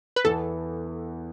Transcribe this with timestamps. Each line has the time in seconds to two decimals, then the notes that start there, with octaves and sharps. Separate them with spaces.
0.16 B4
0.24 E2 E3 B3 A4